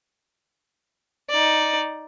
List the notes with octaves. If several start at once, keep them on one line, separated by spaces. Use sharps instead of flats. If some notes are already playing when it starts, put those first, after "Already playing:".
D#4 D5